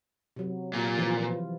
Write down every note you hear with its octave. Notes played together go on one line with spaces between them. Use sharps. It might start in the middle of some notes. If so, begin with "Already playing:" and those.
C3 F#3
A#2
E3 F3 F4